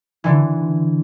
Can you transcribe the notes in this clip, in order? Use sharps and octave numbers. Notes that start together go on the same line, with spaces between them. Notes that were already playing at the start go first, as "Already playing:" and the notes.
D3 E3